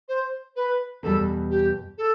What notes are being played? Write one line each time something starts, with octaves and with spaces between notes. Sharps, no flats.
C5
B4
E2 B2 G3 A4
G4
A4